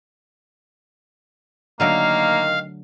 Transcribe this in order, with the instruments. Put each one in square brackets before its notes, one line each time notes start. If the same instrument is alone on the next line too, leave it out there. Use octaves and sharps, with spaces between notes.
[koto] D3 F#3 A3 [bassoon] D#3 [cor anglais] A#3 [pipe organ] F5